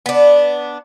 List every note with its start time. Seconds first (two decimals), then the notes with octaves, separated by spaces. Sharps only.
0.06 B3 D4